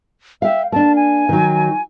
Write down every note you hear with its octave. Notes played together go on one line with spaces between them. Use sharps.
E5 F5 G5
A#3 D4 A5
G#5
D#3 F#3